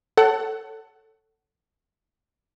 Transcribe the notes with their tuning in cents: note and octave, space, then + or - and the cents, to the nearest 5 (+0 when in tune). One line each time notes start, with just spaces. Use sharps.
A4 +10 C#5 +0 F#5 +25